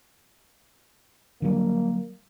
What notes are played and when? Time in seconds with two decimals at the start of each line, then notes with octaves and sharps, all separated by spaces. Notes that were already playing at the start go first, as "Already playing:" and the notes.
1.42 D3 F#3 G3 A#3